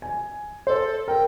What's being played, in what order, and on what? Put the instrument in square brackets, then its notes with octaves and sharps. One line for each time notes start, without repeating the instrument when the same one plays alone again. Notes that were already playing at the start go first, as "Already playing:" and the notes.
[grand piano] G#5
[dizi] A4 [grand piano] C5
[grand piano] A#4 [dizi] G5